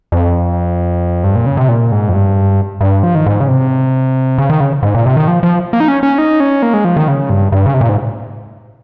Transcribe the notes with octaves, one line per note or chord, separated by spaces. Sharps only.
F2
G2
A#2
C#3
C3
A#2
G#2
F2
G2
G2
F3
D#3
G#2
C#3
C3
C#3
D#3
C#3
G#2
A#2
C3
D#3
F3
F3
A#3
D#4
C#4
C#4
D#4
C#4
A#3
G#3
F3
D#3
C#3
G2
G2
C#3
C3
A#2
G#2